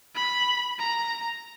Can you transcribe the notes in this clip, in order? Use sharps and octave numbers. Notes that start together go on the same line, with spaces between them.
B5
A#5